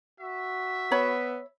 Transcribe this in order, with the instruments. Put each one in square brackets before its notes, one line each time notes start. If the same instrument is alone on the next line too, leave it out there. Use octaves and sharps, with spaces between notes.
[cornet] F#4 [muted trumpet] E5
[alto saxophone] B3 [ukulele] C#5 B5